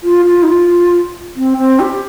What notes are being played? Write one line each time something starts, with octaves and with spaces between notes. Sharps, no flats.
F4
F4
D#4
F4
C4
C4
G4